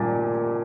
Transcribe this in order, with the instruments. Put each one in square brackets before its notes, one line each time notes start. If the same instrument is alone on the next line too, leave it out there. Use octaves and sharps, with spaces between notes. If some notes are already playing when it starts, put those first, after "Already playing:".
Already playing: [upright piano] A#2 G3 A6